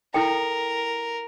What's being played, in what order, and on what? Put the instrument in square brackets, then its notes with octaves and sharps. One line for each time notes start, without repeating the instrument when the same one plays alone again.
[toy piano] E4 A4 G5 [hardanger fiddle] A#4